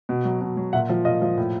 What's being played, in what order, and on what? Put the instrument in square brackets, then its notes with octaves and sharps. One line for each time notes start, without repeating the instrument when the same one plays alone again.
[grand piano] B2
F#3
B2
F#3
A#2 E5 F#5
F3
A#2 D#5 F5
F3
A2